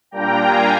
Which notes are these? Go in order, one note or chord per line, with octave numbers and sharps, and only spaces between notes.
A#2 G3 A#3 D4 G5 A#5
F5 G#5